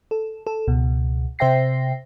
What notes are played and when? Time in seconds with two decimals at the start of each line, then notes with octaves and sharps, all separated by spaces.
0.11 A4
0.47 A4
0.68 C#2 B2
1.39 C3 C5 E5 G5 A#6 C7